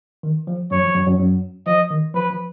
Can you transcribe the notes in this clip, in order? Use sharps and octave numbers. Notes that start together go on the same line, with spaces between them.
D#3
F3
F#2 F#3 C#5
F3
F#2 F#3
F#2 F#3
F#2 F#3
F3 D#5
D#3
F3 B4
F3